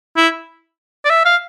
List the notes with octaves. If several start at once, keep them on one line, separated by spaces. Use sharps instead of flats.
E4
D5
E5
F5